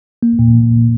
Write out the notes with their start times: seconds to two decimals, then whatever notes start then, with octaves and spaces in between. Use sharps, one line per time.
0.23 A#3
0.39 A#2